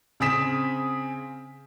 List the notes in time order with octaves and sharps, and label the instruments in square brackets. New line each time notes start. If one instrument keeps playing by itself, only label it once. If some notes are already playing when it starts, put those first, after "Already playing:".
[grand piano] C#3 C4 G#4 D#6 B6 E7